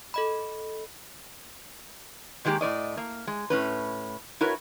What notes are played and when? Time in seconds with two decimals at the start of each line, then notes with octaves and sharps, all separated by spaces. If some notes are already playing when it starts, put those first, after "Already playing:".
0.14 A4 D#5 B5
2.45 D#3 F#3 G#3 A#3 G4
2.61 A2 C4 D5 D#5
2.97 A#3
3.27 G#3
3.50 A2 C#4 B4
4.41 E4 F#4 A#4 B4 C#5